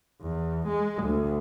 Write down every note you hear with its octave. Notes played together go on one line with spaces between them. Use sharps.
E2
G#3
D2